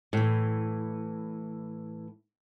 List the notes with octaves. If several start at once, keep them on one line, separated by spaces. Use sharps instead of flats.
A2 E3